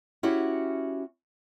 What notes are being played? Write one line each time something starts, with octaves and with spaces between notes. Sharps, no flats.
C#4 E4 F#4 G4 E5